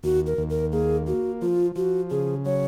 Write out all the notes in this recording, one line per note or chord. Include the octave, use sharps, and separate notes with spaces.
D#2 F#4
A#4
D#2
A#4
A#3 G#4
A#3 F#4
F3 F4
F3 F#4
C#3 G#4
F#3 C#5